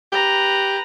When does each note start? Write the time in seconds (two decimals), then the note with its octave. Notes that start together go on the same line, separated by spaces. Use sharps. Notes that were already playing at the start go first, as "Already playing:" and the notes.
0.12 G4 B4 A#5